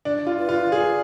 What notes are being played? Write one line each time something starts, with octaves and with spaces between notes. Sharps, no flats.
D4
F4
B4
F4
G#4 D5